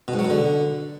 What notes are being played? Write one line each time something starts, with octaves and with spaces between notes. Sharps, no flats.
B2
G#2
F#3
B2
D3